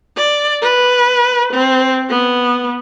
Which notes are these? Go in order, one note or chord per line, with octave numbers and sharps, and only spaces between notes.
D5
B4
C4
B3